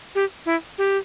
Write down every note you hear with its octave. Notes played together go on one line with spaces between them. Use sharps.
G4
E4
G4